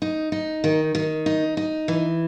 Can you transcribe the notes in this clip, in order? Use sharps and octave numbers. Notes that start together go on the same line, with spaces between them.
D#4
D#4
D#3
D#3
D#4
D#4
E3